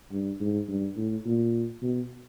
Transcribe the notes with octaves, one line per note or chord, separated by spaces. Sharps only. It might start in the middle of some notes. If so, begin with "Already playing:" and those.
G2
G#2
G2
A2
A#2
B2